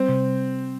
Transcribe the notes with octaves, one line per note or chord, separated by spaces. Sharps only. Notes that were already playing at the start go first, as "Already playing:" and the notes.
Already playing: G3 C4
C3